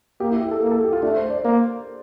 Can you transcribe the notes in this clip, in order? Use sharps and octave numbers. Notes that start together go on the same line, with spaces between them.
A#3 G4
E4
G4
A4
A#3
A4
G4
F4
A3 D4
C5
D5
A#3